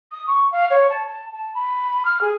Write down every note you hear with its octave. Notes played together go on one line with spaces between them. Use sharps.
D#6
C#6
F5
C#5
A5
A5
A5
B5
F6
G#4